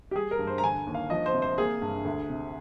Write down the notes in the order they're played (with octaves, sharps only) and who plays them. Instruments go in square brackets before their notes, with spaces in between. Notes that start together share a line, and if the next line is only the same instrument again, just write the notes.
[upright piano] G4
G3 G#4
A#4
G2
C5
A#5
D3 G#5
D#2
F5
F3 D#5
C5
C3
C5
A#3 G#4
G2
D2
C3